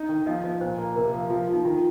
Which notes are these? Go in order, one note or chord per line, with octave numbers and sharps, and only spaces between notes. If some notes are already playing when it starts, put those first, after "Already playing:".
Already playing: D#4
D#3
F3 D#5
F3 D#5
A#2 C5
A#3
C3 A#4
F3
F3 F4
F3
D#4
D#3 F4